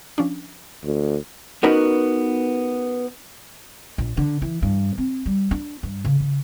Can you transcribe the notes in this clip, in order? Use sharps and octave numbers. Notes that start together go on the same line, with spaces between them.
F3 C#4 D4
D2
B3 C#4 D#4 F#4 A#4 B4
A#1
D3
E3
G2
C4
G3
D4
G2
C#3
C#3